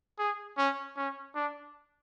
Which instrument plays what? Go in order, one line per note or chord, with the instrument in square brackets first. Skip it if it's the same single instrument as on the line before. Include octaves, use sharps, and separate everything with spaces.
[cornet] G#4
C#4
C#4
D4